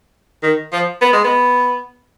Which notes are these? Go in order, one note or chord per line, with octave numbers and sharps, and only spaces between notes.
D#3
F3
B3
G#3
B3